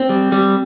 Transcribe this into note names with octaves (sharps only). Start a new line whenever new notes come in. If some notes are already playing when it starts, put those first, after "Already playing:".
Already playing: C4
G3
G3